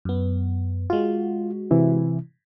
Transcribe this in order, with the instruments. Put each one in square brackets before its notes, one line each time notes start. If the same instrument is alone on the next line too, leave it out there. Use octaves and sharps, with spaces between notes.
[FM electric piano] F#2 B3
[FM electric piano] G#3 F#4 [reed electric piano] F4
[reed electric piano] C3 E3 E4